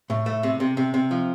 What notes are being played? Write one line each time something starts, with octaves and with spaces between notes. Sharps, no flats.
A2
A3
C3
C3
C3
C3
F3